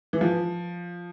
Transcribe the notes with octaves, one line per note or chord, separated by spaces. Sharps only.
E3
F3